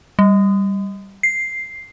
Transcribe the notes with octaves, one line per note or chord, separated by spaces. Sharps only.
G3
C7